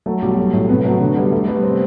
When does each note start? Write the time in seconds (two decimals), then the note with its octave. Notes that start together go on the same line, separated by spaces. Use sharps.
0.06 F#3 A3
0.22 B1 G3
0.38 F#3
0.53 A2
0.69 C3 B3
0.79 B3
0.85 F#3 A3
1.00 D3 B3
1.16 G3 B3
1.32 G3 A3
1.48 G3 B3
1.63 C3 C4